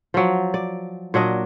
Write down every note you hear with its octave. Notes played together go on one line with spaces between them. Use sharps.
F3 F#3
D5
A#2 F#3 D4 D#5